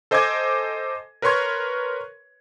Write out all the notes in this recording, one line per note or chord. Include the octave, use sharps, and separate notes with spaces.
A4 C5 D#5 G#5 D6 G#6
A#4 B4 C#5 C6 C#6 G#6